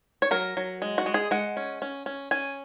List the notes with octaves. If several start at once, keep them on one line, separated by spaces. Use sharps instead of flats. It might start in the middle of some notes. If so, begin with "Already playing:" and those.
C#5
F#3 A#4
F#3
G#3
F#4
G#3
G#4
G#3 F#5
C#4
C#4
C#4
C#4 G#5